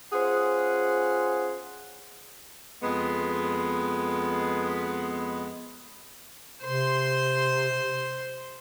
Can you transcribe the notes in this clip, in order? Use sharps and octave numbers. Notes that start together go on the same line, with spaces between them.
C#4 F4 G#4 C5 F#5
F2 G#3 B3
C3 C5 C6